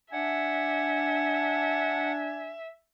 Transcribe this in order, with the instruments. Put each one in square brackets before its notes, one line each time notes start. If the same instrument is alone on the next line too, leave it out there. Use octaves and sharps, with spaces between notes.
[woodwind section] D4 [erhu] E5 [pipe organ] F#5 [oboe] G#5